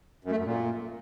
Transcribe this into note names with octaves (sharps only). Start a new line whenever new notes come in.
F#2
A3
F#2
A#2